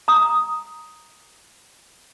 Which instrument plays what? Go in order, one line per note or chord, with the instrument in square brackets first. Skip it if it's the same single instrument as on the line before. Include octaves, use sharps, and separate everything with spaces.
[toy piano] A#5 D#6